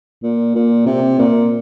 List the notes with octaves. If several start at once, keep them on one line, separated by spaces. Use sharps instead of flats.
A#2
A#2
C3
A#2